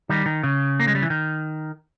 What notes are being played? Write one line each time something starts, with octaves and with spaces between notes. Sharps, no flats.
D#3 G3
D#3
C#3
A#3
G#3
G3
E3
D#3